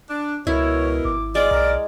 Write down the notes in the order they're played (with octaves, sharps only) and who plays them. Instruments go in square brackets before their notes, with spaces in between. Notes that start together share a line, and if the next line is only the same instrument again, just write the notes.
[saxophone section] D4
[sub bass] C#2 [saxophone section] B2 B3 A#4 [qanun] E4 [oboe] C#5
[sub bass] G#1 [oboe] D6
[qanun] G#3 [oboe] F4 [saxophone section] D5
[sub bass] B1 [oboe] A#4